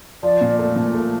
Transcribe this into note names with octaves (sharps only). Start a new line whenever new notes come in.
F3 D5
A#2
A3
A#2
A3